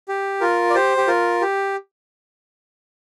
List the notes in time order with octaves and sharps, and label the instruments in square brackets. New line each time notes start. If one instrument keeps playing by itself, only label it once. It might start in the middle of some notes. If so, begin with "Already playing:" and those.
[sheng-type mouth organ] G4
F4 A#4
D5
G4 C5
G4
F4 A#4
G4